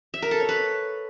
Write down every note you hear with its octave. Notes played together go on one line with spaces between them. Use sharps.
E5
A#4
A4
C#5
B4